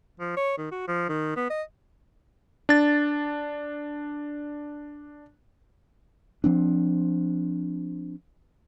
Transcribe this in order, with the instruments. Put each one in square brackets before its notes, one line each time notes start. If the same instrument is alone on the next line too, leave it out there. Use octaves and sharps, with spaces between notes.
[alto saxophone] F3
C#5
D#3
F#4
F3
D#3
B3
D#5
[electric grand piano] D4 A6
[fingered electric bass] F3 C4 D4